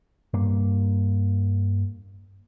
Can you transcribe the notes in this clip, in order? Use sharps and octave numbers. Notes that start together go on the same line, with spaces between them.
G2 A#3